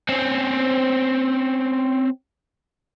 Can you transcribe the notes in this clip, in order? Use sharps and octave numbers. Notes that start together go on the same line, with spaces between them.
C4 C#4